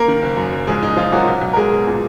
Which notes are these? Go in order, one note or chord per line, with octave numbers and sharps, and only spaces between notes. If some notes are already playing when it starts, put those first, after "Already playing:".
Already playing: A#3 A#4
D#3
F#1
F#2
F#1
A#1 G#3 G#4
A#1 D#4
A#1 F3 F4
A#2 F#3 F#4
B1
B1
A#4
B1 G#3 G#4
B2
A#2